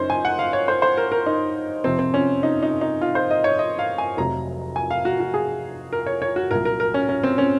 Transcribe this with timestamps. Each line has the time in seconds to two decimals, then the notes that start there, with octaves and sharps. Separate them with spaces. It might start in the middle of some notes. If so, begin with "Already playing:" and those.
Already playing: F#1 F#2 C#4 D#4 C5
0.10 G#5
0.25 F#5
0.39 F5
0.53 C#5
0.68 C5
0.82 C5
0.97 A#4
1.12 A#4
1.26 D#4
1.84 F2 C3 F3 C4
1.99 C4
2.14 C#4
2.43 D#4
2.63 D#4
2.81 D#4
3.01 F4
3.15 C5
3.31 D#5
3.44 C#5
3.59 D#5
3.79 F5
3.98 G#5
4.17 F1 F2 C3 F#3 A#5
4.76 G#5
4.91 F5
5.05 F#4
5.20 F#4
5.34 G#4
5.93 A#4
6.06 C#5
6.22 C#5
6.36 F#4
6.51 C2 A#2 F#3 A#4
6.65 A#4
6.80 A#4
6.94 C#4
7.09 C#4
7.24 C4
7.38 C#4